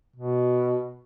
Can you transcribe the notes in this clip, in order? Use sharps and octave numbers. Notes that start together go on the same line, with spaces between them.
B2